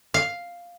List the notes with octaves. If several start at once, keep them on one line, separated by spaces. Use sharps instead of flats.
F5